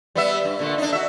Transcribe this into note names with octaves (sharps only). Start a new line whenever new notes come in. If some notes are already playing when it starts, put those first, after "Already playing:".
G3 B3 E5
G2
A#2 D3 A3
D4 D#4
F#4 E5